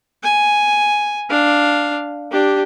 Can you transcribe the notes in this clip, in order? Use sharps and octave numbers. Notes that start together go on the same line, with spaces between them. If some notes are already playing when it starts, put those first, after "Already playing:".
G#5
D4 F5
D4 G4